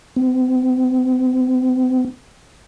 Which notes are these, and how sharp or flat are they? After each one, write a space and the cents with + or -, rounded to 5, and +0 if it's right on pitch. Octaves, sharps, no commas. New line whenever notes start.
C4 -40